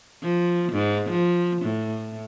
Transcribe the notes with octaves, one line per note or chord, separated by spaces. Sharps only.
F3
G#2
F3
A2